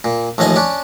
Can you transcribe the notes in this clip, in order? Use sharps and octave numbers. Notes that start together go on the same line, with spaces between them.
A#2
A1 D#2 F3 D#5 G#5
C#4 D4